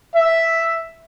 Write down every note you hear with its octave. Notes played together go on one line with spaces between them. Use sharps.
E5